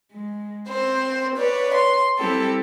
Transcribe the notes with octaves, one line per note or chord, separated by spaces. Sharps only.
G#3
C4 C5
B4 C#5 D5
C6
G3 C4 E4 G4 A4